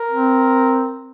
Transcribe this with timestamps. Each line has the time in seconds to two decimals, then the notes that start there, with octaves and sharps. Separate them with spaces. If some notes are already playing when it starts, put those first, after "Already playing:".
Already playing: A#4
0.10 C4